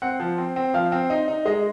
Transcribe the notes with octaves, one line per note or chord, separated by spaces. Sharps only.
C4 F#5
F3
C4
C4
F3 F5
C4
D#4
D#4
G#3 D#5